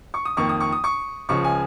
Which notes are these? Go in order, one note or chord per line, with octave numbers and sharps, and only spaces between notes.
C#6
D#6
F2 D#3 A#3 C#6
D#6
C#6
D#6
C#6
C#2 C#3 F3 G#3 C#6
G#5